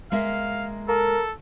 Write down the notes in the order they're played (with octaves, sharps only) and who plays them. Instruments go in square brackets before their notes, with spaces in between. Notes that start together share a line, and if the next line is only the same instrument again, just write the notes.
[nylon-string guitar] G#3 A#3 E5 [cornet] F5
[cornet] A4 [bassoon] A#4